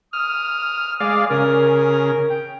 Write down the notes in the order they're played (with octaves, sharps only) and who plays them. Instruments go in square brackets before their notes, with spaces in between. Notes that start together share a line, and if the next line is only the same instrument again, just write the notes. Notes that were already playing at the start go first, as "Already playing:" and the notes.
[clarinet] D#6 [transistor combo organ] F6
[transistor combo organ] G#3 D5 F5
[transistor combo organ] C#3 [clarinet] A#4
[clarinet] G5